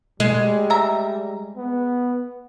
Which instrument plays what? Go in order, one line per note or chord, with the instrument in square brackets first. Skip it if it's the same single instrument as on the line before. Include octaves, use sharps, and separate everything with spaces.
[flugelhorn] G3 [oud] G#3
[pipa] E5 A#5
[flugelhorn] B3